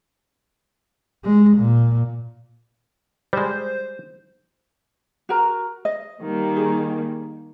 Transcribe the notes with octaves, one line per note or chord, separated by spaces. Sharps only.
G#3
A#2
G3 G#3 C5
F#4 A#4 A#5
D#5
D#3 G3 A#3
G#4